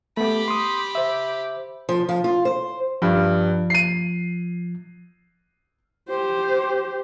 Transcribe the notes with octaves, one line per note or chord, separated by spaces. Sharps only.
A3 B3 G4 B5
C6 D#6
C5 E5
F3
F3
F4
C5
G2 F3
C7 D#7
G4 C5